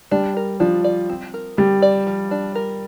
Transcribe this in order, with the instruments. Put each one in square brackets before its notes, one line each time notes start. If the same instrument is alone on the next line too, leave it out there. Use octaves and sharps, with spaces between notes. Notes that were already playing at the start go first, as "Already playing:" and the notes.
[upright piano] G3 [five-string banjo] D4
[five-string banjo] A#4
[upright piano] F3 [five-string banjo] D4
[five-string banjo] D5
C4
A#4
[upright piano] G3 [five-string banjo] C4
[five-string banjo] D5
F3
D4
A#4